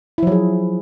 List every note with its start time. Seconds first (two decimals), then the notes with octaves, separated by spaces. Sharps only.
0.18 E4
0.23 F3
0.27 F#3
0.32 G#4